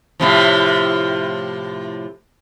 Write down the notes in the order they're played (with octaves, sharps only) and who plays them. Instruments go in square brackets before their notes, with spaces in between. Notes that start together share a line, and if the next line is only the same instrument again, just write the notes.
[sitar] A2 C3 F3